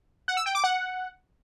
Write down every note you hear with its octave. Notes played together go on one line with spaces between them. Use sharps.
F#5
E6
G5
D6
F#5